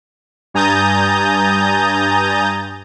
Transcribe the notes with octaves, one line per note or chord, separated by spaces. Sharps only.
G2 G#5 A#5 D#6 G6 A6